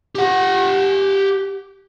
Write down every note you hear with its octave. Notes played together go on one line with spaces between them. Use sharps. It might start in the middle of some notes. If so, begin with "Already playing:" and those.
G4 F#5